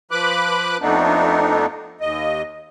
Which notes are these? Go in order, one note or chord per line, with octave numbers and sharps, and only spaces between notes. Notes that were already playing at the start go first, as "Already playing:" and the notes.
F3 B4 B5 D6 F#6
F2 A3 B3 D4 D#4
D#2 D#5